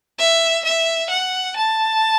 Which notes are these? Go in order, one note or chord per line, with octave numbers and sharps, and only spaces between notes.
E5
E5
F#5
A5